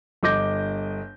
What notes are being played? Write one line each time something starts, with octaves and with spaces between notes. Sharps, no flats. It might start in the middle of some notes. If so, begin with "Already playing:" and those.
G1 D#5 D6 G6 A#6